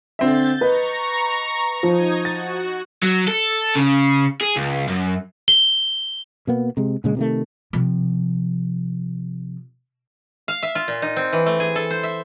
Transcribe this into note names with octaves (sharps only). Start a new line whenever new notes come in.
D3 C4 E5 G6 A6
B4 D#5 A#5 C#6
F3 D#4 D#6 G#6
F#4 A6
F#3
A4
C#3
G#4
C#2
F#2
G7
B2 A#3 B3
C3 G#3
A#2 C#3 G#3
C3 D#3 A3
C3 F3
F5
E5
F4
A#2
D#4
C4
E3
A3
G#4
A4
C5
E5